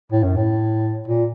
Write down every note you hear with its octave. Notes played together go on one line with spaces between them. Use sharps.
A2
F#2
A2
A#2